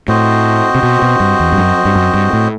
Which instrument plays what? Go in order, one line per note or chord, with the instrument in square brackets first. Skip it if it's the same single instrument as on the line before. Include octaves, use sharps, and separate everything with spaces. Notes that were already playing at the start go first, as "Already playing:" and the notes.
[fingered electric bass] A2 [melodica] C4 F#4 C5 D#5
[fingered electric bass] C3
B2
B2
G2
E2
G2
F#2
G2
F#2
G2
A2